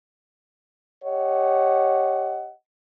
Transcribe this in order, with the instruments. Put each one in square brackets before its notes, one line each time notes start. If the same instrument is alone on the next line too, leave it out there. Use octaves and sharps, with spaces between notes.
[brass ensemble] G4 C#5 D#5 F#5